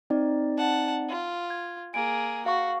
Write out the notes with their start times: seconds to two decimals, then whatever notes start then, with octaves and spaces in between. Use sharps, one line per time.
0.10 C4 D#4 D5
0.58 F#5 A5
1.09 F4
1.50 G#6
1.94 A#3 G#4 D7
2.46 F#4 F5 C#6